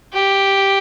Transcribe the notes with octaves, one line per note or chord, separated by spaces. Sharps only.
G4